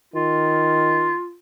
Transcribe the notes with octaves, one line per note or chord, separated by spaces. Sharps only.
D#3 F4